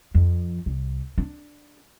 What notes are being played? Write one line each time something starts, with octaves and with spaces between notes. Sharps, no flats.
F2
C2
D4